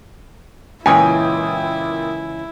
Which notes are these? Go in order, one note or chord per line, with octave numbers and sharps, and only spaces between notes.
C#2 A#2 E3 E4 G5 G#5 D#6